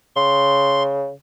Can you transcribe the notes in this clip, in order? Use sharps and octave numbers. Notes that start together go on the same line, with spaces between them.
C#3 C6